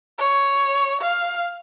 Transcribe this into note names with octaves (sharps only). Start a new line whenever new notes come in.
C#5
F5